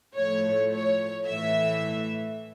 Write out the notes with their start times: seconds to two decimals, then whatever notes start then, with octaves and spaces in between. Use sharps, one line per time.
0.16 A2 F3 A3 C#5
0.72 C#5
1.27 A2 E3 A3 E5